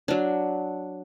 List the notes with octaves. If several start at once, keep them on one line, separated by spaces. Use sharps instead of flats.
F#3 D4